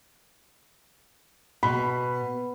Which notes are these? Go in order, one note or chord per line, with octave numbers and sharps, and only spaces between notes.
B2 B5